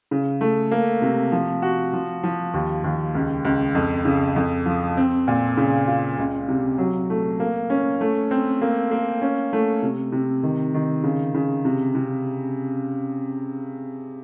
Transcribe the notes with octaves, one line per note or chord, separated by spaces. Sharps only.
C#3
A3
A#3
C3
F3
F#4
F3
F3
D#2
D#2
C#2
C#2
F2
C#3
F2
F3
C4
A#2
C#3
F4
C#2
C3
F#3
A3
A#3
C#4
A3
C4
A#3
A#3
C#4
A3
C3
C3
D#3
D#3
C#3
C#3
C3
C3